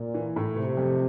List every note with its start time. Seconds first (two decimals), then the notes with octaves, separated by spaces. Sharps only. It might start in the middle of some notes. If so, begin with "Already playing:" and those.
Already playing: A#2
0.14 E3
0.36 A2
0.56 C3 A3
0.77 F2